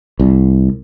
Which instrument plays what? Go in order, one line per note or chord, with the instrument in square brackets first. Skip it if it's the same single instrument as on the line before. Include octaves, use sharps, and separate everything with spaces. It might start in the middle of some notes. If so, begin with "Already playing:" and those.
[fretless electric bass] C2